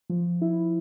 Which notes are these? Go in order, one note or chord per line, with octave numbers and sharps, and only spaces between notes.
F3
E4